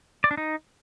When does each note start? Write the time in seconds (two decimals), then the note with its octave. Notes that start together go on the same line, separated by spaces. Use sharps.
0.24 D5
0.31 D4
0.37 D#4